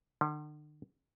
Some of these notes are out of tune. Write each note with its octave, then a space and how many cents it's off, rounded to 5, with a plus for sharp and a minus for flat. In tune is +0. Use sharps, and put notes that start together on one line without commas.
D3 +45